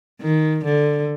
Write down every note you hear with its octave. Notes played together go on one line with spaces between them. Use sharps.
D#3
D3